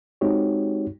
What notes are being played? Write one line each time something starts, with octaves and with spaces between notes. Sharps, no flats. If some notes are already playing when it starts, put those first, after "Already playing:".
G#3 C4 D#4 F#4 G4 C#5